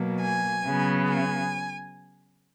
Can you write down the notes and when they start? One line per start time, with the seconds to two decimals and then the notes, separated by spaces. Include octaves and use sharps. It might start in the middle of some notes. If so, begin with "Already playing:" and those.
Already playing: B2 F#3 A#3
0.22 G#5
0.65 C#3 F#3 B3
1.10 G#5